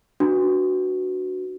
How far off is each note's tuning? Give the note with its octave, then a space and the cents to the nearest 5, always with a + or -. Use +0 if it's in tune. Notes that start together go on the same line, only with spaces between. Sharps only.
D4 +0 F#4 +0 B4 +0